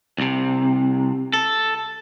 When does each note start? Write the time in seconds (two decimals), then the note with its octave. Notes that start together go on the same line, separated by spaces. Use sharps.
0.18 C2 C3
1.33 A4